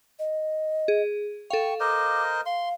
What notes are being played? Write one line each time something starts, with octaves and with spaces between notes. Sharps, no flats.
D#5
G#4
A4 F5 G5 C#6
A#4 C5 D#5 D6
F5 C6